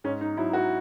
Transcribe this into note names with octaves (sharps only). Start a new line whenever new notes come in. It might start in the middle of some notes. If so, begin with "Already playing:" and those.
G#2 C#4
D#4
F#3 E4
F#4